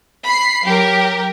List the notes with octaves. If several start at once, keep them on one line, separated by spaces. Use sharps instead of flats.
B5 C7
F#3 G4 A#4